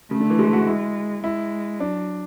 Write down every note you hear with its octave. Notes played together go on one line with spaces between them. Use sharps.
C#3 A3
D3
E3
G#3
F#4
G#3 E4
G#3 E4
F#3 D4